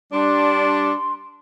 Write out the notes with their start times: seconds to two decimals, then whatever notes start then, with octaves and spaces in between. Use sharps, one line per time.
0.13 G3 D4 C6